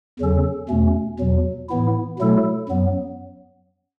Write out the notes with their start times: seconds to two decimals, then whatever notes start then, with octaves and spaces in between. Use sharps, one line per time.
0.20 E2 C#3 F#3 C#4 A4
0.69 E2 B2 A3 C#4
1.20 E2 B2 F#3
1.69 A2 E3 B3 E4
2.19 B2 F#3 A3 E4 A4
2.69 F#2 F#3 B3